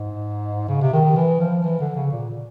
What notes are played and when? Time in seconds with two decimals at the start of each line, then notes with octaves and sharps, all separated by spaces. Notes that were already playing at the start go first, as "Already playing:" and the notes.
Already playing: G#2
0.69 C#3
0.81 C3
0.93 D#3
1.05 D#3
1.17 E3
1.41 F3
1.64 E3
1.80 D3
1.96 C#3
2.12 A#2